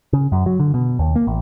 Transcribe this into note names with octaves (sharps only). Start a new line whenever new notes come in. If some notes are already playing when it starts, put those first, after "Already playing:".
C#3
F#2
F#3
D3
B2
D#2
A#3
A1